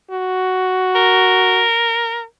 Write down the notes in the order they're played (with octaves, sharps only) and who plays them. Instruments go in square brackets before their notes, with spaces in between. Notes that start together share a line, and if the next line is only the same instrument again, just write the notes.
[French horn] F#4
[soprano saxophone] A#4